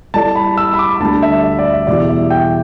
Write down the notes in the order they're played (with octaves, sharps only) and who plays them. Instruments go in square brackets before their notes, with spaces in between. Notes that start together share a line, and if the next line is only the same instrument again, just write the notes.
[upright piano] G3 E4 A4 D5 [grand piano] A5
[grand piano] B5
E6
B5
D6
[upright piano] D2 D3 G3 D4 [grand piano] A5
[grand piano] E5
E5
D5
E5
[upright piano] E2 B2 G3 E4 G4 [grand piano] D5
[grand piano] E5
G5